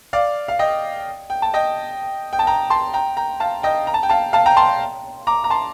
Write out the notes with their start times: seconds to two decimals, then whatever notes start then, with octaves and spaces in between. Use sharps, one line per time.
0.13 D5 F5
0.48 F5
0.59 D#5 G5
1.30 G5
1.42 A5
1.54 D#5 G5
2.33 G5
2.39 A5
2.47 G5 A#5
2.70 A5 C6
2.94 G5 A#5
3.17 G5 A#5
3.40 F5 A5
3.63 D#5 G5
3.87 A#5
3.94 A5
4.03 G5
4.09 F5 A5
4.33 F5 A5
4.46 G5 A#5
4.57 A5 C6
5.27 A#5 D6
5.44 A#5
5.50 A5 C6